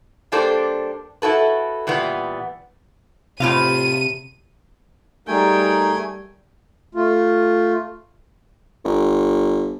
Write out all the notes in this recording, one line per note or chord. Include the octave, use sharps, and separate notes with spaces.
G3 A#3 D4 G4 A4 C5
E4 F#4 A4 B4
A#2 E3 G3 B3
A2 C3 F4 F5 D#7
G3 A3 D#4 G#4 A#4 G5 G#5
A3 F4
G1